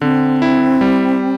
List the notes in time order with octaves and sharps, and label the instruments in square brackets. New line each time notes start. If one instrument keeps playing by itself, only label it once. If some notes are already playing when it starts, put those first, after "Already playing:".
[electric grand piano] D3 [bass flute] C4
[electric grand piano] E4
G3